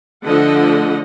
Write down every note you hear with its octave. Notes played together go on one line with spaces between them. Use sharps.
D3 F3 A3 D#5 F#5